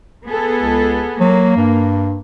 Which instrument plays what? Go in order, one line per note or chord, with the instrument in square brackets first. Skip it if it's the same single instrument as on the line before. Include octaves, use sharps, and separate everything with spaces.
[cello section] B3 G#4 A4
[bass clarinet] C#2
[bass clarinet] F#3 [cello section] A#3
[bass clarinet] G2